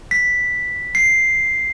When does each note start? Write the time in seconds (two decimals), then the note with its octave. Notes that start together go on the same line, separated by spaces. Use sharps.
0.11 B6
0.95 C7